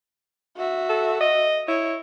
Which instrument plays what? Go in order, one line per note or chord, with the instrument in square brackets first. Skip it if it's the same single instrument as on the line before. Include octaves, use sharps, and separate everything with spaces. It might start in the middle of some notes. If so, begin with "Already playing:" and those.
[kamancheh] F#4 E5
[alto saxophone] A4
D#5
[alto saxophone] E4 [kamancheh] C#5